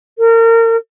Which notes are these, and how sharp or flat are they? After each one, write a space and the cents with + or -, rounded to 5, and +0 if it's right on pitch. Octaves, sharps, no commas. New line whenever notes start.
A#4 -30